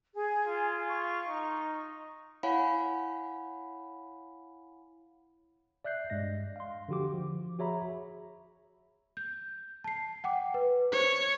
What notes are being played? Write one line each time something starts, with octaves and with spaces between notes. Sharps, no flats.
G#4
F4
C#6
D#4
E4 C#5 F5 F#5 G#5 B5
D5 E5 F#6 G6 C7
G2 G#3 D#5 A#6
F5 C6
D3 F3 F#4 G4 D6
F3
F#4 G#4 C#5 E5 A#5 B5
G6
A5 C7
F#5 G5 D6
B4
C5 C#5